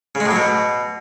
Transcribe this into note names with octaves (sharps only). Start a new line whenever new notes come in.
C#3
G#3
A2
F#3
B2